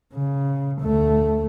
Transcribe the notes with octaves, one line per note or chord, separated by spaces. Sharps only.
C#3
D2 A3